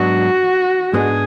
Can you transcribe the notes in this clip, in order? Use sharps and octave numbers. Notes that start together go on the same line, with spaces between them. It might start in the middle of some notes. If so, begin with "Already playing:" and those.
Already playing: G#2 F#3 B3 D4 F#4
G#2 G#3 B3 D4 G#4